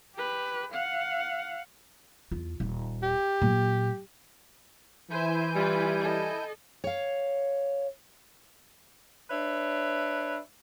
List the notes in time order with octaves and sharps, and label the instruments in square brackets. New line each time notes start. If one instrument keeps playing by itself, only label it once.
[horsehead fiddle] G4 B4
F5 F#5
[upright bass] E2 F4
D#1
[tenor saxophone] G4
[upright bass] A#2 F#3
[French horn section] E3 [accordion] E4 G#5 G6 [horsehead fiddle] C5 E5
[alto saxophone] G3 [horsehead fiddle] F4 B4
[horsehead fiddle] A4 D#5
[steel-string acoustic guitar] C#5 F5
[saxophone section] D4 B4 C#5 E5